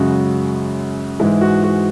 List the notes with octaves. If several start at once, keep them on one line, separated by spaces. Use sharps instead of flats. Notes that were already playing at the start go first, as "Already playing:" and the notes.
Already playing: F#2 C#3 G#3 F#4
G#2 E3 G#3 E4
F#4
F#4